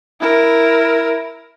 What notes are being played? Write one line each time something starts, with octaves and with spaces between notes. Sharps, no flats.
E4 A#4